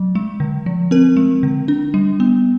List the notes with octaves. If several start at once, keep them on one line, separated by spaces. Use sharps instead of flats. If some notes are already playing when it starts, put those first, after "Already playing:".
Already playing: F#3
G#3
D3
F3
C4 A#4
G#3
D3
D4
G3
B3